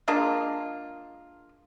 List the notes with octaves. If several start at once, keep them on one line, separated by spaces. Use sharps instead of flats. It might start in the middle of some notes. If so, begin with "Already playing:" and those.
G#3 A#3 D4 F4